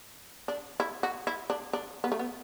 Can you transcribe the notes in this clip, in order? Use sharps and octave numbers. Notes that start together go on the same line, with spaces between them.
D4
E4
F#4
E4
D4
D4
B3
A3
B3